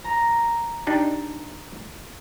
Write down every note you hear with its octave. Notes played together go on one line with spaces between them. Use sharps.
A#5
D4 D#4 G4